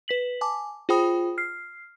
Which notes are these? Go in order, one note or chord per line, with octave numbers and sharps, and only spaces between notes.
B4 B6 F#7
G#5 A5 D6
F4 G#4 C5 G5 B5 D#6
F6 C7